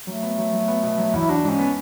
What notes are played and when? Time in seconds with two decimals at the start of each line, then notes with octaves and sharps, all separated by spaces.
0.07 F#3 A3
0.23 B3
0.38 F#3
0.53 F#3
0.68 B3
0.83 B2
0.98 F#3
1.13 E2 E4
1.29 D4 F#4
1.44 G#2 C#4
1.59 B3